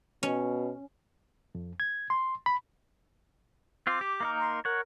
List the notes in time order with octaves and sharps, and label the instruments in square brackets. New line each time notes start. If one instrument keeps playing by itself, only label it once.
[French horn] B2 [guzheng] C#4
[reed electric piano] F2
G#6
C6
B5
[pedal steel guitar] C4 F4 [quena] D6
[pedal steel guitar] G4
A#3 D#4 A#4
[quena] C6
[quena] A#4 [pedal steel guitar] C#5 F#5